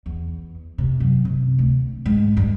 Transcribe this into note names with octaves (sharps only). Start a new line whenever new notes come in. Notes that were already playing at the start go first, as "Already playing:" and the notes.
E2
C3
F#2
C3
D2
G#2
G2